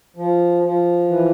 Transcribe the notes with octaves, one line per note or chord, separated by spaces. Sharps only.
F3
F3
E3